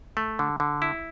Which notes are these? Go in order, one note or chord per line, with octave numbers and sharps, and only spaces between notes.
A3
D3
D3
E4